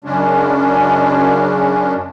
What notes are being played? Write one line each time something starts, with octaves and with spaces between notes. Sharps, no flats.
F#2 C#3 G#3 C#4 D4